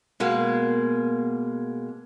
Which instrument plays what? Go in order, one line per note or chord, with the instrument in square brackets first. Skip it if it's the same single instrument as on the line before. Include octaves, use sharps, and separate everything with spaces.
[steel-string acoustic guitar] B2 G#3 A#3